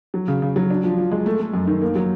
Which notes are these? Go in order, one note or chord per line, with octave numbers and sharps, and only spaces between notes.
F#3
C#3
C#3
F#3
D4
F3
F3
G#3
A3
A3
F#2
D#3
A#3
F#3